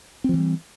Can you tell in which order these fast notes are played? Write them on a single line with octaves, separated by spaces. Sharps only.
C4 F3 E3 G3